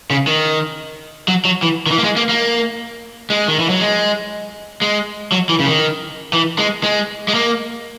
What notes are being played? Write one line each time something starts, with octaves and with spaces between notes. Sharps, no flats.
C#3
D#3
F#3
F#3
E3
D#3
E3
A#3
G#3
A#3
A#3
G#3
D#3
E3
F#3
G#3
G#3
F#3
E3
C#3
D#3
E3
G#3
G#3
G#3
A#3